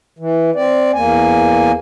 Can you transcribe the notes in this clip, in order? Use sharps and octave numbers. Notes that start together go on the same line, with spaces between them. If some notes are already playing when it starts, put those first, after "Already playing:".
E3
C4 D5
E2 A#3 G#5